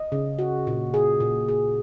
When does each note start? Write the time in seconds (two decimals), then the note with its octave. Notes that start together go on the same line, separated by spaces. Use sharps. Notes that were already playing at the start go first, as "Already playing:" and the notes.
Already playing: D#5
0.12 C#3
0.39 F#4
0.67 A#2
0.94 G#4
1.20 A#2
1.48 G#4